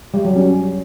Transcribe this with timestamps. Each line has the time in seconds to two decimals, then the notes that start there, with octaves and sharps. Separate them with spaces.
0.14 G3
0.25 F#3
0.36 C#4